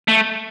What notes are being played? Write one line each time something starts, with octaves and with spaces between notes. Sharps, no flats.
A3